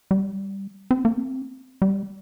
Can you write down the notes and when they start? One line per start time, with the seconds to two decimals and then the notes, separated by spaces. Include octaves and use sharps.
0.11 G3
0.91 C4
1.05 A#3
1.18 C4
1.82 G3